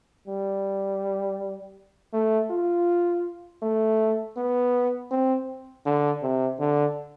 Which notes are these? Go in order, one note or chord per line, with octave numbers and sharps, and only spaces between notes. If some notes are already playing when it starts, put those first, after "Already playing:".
G3
A3
F4
A3
B3
C4
D3
C3
D3